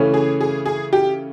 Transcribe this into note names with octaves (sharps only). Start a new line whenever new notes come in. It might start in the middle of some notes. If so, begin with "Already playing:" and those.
Already playing: C#3 E3 A3 C#4
G#4
G#4
G#4
G4